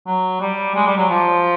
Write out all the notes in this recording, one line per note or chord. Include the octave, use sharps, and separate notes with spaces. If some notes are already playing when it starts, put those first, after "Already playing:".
F#3
G3
G#3
G3
F#3
F3